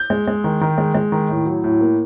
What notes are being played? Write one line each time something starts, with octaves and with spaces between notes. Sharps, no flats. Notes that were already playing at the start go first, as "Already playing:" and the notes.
Already playing: G6
G#3
G#3
D#3
D#3
G#3
G#3
D#3
A2
F#3
A2
A#3